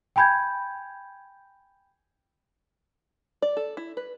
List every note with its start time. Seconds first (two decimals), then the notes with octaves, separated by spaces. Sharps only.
0.16 G5 G#5 B5 G6 G#6
3.42 D5
3.57 A4
3.77 E4
3.97 B4